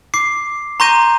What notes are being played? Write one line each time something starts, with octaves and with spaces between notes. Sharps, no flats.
D6 C7
A#5 C6 C#6 G6 A#6 D#7